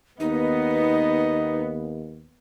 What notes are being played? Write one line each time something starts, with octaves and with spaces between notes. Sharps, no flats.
D#2 B3 D#4 D#5